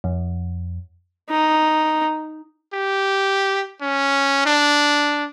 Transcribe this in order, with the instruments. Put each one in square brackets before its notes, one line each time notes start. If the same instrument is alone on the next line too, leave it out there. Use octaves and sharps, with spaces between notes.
[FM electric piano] F2
[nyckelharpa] D#4
[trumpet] G4
C#4
D4